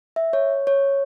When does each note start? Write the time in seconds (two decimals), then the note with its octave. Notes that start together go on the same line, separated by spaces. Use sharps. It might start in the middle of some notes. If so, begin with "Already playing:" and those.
0.16 E5
0.33 C#5
0.67 C#5